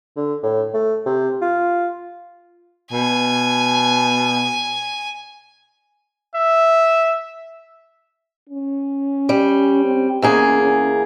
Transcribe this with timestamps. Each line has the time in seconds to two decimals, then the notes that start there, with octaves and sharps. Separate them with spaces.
0.17 D3
0.44 A2
0.74 A3
1.06 C3
1.42 F4
2.92 B2 G#5
6.36 E5
8.49 C#4
9.29 G3
9.85 C4
10.22 E2 A#3 C#4 G#4
10.61 C#4